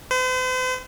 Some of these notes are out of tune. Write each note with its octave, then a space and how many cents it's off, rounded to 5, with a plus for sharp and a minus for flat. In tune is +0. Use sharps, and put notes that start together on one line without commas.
C5 -45